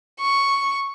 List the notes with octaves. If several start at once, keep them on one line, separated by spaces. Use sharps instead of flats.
C#6